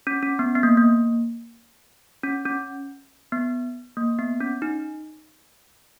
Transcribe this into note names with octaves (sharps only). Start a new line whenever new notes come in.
C#4
C#4
B3
B3
A#3
A#3
C#4
C#4
B3
A#3
B3
C#4
D#4